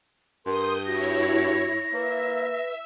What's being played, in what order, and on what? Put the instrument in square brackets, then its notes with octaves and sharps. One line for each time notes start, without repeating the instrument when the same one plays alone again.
[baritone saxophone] G2 [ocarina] A#4 [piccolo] C6 [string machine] D#6 G6
[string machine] E4 C#5 [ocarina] F#4 [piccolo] A#6
[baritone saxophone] A#3 [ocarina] B4 [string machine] E5